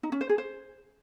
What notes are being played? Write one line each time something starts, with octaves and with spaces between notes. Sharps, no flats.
D#4
C#4
C5
G#4
C5